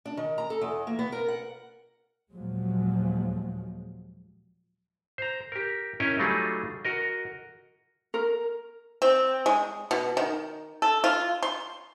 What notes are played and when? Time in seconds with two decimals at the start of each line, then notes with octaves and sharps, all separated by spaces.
0.05 D4
0.17 D#3
0.38 A#5
0.50 A4
0.61 E2
0.87 A#3
0.99 B3
1.12 A#4
1.28 F#5
2.33 D#2 A#2 F3 F#3 G#3
5.18 C5 A#5
5.52 G4 A#4
6.00 C#4 E4 A#4 C#5 D#5 G5
6.19 F#3 G3 A3 D#4 F4 G#4
6.85 F#4 A#4 D#5
8.14 A#4
9.02 C4
9.46 G#3
9.91 B2
10.17 D#3
10.82 A4
11.04 F4
11.43 C6